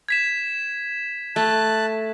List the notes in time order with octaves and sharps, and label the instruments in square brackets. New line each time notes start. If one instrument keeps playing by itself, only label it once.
[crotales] G#6 B6 E7
[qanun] A3 [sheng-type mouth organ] A5 F#6